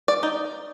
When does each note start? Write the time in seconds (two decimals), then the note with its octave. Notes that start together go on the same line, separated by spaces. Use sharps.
0.08 D5
0.23 D#4